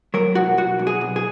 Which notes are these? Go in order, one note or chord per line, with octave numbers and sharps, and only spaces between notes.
F#3 A#4
B1 F#4
B1 F#4
B1
G#4
B1
G#4